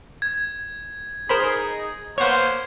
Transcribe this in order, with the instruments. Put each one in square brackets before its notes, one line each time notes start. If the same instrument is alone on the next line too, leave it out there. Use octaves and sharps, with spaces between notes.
[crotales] G#6
[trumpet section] D#4 G#4 [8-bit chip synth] A#4 C5 B5
[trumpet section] A#3 B3 C5 [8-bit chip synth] C#5 F#5